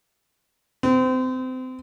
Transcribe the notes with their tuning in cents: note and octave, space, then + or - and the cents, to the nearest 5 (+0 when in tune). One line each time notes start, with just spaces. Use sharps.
C4 -30